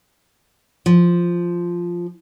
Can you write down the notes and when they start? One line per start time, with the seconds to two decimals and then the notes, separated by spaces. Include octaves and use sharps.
0.86 F3